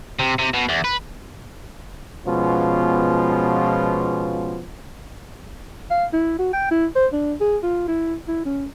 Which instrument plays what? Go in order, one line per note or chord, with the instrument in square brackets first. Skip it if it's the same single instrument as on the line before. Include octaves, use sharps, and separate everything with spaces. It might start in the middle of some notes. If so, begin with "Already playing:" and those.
[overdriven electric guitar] C3
C3
B2
E2
B4
[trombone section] B2 F3 G#3 B3 C#4 F4
[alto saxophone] F5
E4
F#4
G5
E4
C5
D4
G#4
F4
E4
E4
C#4